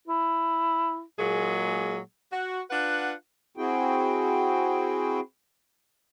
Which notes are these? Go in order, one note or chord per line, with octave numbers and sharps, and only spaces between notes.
E4
A#2 F#3 G#3 A#3 G#4
F#4
D4 F4 B4 F#5
C4 E4 F#4 G#4 G5